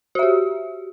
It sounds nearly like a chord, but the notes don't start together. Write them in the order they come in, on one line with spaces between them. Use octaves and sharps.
F#4 E5 G4